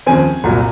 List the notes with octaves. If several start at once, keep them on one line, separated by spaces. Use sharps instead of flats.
D#2 C#3 F3 C4 G#5
C2 A#2 F#3